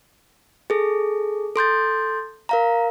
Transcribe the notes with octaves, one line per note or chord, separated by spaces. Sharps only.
G#4 A4
A4 C6 G6 A6
A#4 F5 A#5